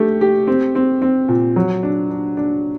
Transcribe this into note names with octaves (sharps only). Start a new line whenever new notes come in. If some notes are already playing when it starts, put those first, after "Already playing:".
Already playing: A3 D4 G4
G4
C4
C4
C4
A#2
F#3
D4
D4
D4